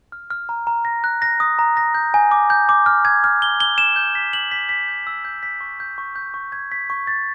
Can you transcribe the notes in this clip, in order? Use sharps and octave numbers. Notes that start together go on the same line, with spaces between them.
F6
F6
A#5
A#5
A#6
F#6
A#6
D#6
A#5
A#6
G6
G#5
D6
G6
D6
F6
G#6
F6
G7
G7
E7
G6
B6
F#7
B6
B6
G6
E6
G6
B6
C#6
G6
C#6
G6
C#6
G#6
B6
C#6
A6